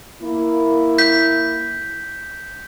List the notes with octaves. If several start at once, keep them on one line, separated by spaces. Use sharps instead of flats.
A#3 E4
G6 B6